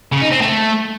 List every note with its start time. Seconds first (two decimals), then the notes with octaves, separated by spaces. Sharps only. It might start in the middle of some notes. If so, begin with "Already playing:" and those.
0.12 C#3
0.22 D#4
0.31 C4
0.41 A3